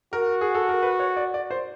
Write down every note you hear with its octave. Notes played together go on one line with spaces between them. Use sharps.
F#4 A#4
G#4
A4
A#4
B4
C#5
D5
D5
C5